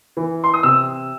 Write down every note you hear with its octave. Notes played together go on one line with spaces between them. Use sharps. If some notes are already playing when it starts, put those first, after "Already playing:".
E3
C6
D#6
C3 E6